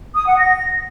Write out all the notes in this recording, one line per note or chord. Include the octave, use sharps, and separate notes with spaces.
D#6
F#5
A#6